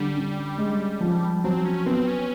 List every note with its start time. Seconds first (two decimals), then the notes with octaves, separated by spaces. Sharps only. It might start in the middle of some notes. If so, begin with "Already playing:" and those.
Already playing: D3 G3
0.17 C#4
0.58 G#3
1.01 F3
1.44 F#3 C4
1.65 C#4
1.86 B3 C4
2.08 C#4